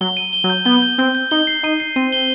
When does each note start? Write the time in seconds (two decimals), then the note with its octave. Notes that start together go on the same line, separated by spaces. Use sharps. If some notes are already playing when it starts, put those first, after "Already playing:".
0.01 F#3 G7
0.17 D#7
0.33 G7
0.44 F#3
0.50 G6
0.65 B3 G7
0.82 G6
0.98 C4 G6
1.15 G6
1.31 D#4 G7
1.47 C7
1.63 D#4 D#7
1.80 C7
1.96 C4 D#7
2.12 G7